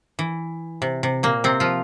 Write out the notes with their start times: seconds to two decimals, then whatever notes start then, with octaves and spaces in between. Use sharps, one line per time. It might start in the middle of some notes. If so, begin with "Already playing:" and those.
0.19 E3
0.82 C3
1.03 C3
1.23 A#2 A#3
1.44 C3 C4
1.60 F3 F4